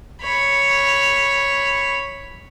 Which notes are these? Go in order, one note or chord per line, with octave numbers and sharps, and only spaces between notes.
C#5 B5